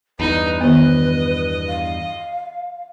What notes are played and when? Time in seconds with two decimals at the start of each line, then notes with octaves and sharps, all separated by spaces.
0.20 E2 G2 D#4 B4
0.61 D#3 B3 D#5
1.67 F5